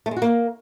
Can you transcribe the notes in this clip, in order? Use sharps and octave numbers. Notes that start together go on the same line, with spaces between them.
A3
G#3
F#4
A#3